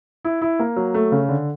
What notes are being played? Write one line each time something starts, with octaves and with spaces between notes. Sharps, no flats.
E4
E4
A#3
F#3
A3
C#3
D3